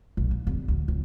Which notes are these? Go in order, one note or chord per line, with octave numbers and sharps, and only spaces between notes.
A#1
A#2
D1
D2
C#2